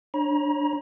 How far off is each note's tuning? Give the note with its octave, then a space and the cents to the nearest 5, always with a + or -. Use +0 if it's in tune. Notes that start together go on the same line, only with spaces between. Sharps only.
D4 +0 C#5 -30 A#5 +35